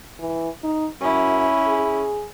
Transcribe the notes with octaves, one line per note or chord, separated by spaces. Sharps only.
E3
D#4
F#2 C#4 E4
G#4